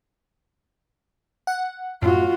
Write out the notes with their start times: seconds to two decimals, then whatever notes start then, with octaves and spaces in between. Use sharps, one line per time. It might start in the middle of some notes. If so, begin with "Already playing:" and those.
1.47 F#5
2.02 F#2 A2 F4 F#4